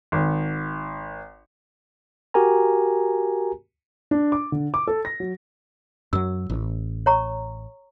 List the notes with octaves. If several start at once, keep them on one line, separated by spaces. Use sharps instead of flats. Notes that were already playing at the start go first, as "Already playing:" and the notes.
G#1
F#4 G4 A#4 G#5 A#5
D4
D6
D3
D6
A4
A#6
F#3
F#2 F#3 E6
A1
C#5 A#5 C#6